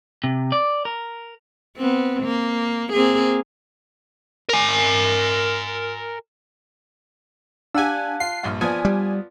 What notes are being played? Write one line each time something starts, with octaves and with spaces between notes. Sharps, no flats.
C3
D5
A#4
B3 C4
A#3
A#3 C4 G#4
A#4 G#5
D4 G4 F5 F#5 G#5 A5 E6 F#6
F4 C7
A#1 G2 F4
F3 B3 F4 D5 G#5 D#6
G3